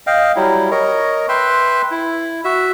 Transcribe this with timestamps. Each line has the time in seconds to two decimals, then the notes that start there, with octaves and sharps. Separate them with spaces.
0.07 D#5 F5 G5
0.36 F#3 G3 E4
0.71 A#4 C#5 D#5
1.29 B4 E5 G5 C6
1.91 E4
2.45 F#4 E5